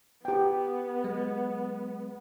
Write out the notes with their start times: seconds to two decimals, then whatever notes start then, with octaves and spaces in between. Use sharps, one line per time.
0.25 B3 G4 G5
1.04 F#3 G#3